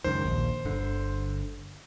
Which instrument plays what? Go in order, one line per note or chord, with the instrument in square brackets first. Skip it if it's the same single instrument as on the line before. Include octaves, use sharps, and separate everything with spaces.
[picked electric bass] C#2 F#2 D#3 [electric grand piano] C5
[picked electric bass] A#1 D#2
G1 D3